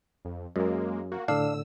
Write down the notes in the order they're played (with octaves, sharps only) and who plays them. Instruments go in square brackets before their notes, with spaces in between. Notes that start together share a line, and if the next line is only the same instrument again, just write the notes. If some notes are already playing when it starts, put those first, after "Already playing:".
[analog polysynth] F2
[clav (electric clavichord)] F#2 [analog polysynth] G#3 A#3
[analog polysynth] A#3 F#4
[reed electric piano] A2 D3 [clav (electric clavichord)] D4 F5 [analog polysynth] E6